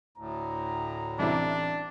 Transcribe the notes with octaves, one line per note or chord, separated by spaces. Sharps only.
D2 A2 A#5
A1 C3 D4 E4